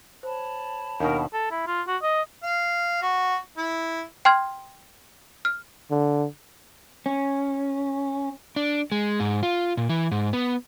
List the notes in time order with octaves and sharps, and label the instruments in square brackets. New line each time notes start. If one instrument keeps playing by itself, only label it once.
[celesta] C5 [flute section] C#5 A5 B5
[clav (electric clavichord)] D#2 B2 [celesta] D4 D#4 [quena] A#4
[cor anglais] A4
E4
F4
F#4
D#5
[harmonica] F5
F#4
E4
[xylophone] G5 C6 F6 G#6
F6
[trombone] D3
[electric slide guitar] C#4
D4
G#3
G#2
F4
A#2
E3
G#2
B3